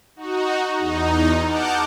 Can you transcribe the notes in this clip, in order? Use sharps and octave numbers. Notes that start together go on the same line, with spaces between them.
D#4 F#4
E2 D#4
F#5 A5 D6 F6 G6